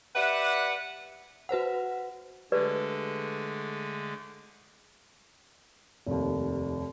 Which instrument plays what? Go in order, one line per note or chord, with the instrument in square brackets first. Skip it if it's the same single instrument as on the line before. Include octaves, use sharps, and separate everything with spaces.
[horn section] G4 B4 D5 E5 F#5
[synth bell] F#4 B4 C5 F#5
[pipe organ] D3 G#3 A3 [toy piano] G4 B4 D5
[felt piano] F1 D#2